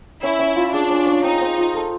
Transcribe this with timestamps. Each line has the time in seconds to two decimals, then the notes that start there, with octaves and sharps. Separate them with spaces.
0.22 C#4 E4
0.39 C#4
0.56 F4
0.73 D4 G#4
0.90 C#4
1.07 C#4
1.24 C4 D#4
1.41 C4
1.58 F4
1.75 A4